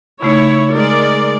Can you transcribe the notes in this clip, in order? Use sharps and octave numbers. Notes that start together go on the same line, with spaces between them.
C#3 A3 D#4 E4 C#5
G#3 A#4 D5